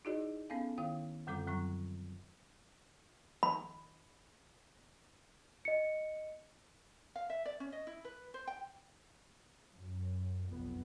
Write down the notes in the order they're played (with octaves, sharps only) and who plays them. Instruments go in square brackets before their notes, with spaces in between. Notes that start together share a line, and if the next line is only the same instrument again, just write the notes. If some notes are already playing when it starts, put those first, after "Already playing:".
[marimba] D#4 E4 F#4 G#4 D5 D#5
B3 C#4 A4 F5 G#5
D#3 E4 F5 G5
F#2 D3 G3 C4 A4 D6
F#2 F#3 C4 C#6
[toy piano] B5
[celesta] D#5 C#7
[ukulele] F5
E5
D5
C#4
D#5
E4
B4
C5
G5
[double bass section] F#2
F1 B1 F2 B3